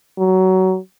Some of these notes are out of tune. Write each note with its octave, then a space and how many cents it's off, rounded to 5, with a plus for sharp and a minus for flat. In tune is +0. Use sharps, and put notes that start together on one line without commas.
F#3 +20